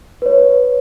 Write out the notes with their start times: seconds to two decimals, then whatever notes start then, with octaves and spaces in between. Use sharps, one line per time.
0.22 B4 C#5